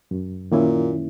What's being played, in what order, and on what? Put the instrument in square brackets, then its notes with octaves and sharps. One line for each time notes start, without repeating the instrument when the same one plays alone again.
[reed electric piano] F#2
[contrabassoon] A#2 [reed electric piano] D#3 A#3 C#4 E4